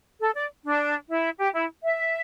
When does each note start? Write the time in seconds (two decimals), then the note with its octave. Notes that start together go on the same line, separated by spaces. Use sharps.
0.20 A4
0.35 D5
0.65 D4
1.08 E4
1.38 G4
1.54 E4
1.83 E5